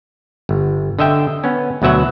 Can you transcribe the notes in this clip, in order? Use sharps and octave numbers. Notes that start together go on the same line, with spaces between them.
G1
D3 D#5 E5 G5
B3 C#4
D2 B2 F#3 E5 F#5